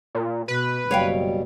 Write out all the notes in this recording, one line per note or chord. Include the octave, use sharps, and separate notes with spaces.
A#2
B2 B4
F#1 B2 G3 C#5 F5 G5